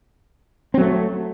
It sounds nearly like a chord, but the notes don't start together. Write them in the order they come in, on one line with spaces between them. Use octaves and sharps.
C4 F#3 A3